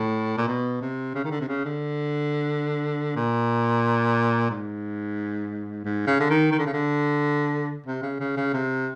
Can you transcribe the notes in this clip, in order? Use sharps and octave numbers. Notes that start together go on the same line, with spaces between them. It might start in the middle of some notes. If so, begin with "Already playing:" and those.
Already playing: A2
A#2
B2
C3
C#3
D#3
D3
C3
C#3
D3
A#2
G#2
G#2
C#3
D3
D#3
D#3
D3
C#3
D3
C3
C#3
C#3
C#3
C3